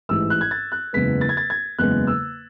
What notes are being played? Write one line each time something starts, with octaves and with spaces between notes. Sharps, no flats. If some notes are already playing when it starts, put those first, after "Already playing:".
A1 G#2 E3 G#3 E6
F#6
G#6
A6
F#6
F#1 E2 C#3 G#3 B3 B6
A6
G#6
A6
G#6
F#1 E2 C#3 G#3 B3 F#6
E6